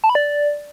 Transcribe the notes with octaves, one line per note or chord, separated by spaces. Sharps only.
A5
B5
D5